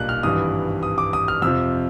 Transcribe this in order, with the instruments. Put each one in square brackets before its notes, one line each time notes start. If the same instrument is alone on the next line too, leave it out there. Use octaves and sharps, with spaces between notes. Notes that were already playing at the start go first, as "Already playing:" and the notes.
Already playing: [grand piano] B1 A#2 G3 A#3 D4 F#6
F6
G#1 G2 E3 G3 D#6
D#6
D6
D#6
F6
F2 C3 F3 E6